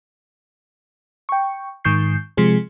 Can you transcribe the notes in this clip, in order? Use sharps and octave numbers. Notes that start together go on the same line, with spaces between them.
G5 C#6
G#2 D#3 C#6 G6 C7
C3 F3 G#3 G#4